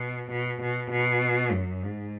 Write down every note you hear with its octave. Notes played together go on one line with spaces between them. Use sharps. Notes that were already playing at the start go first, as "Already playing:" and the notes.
Already playing: B2
B2
B2
B2
F#2
G#2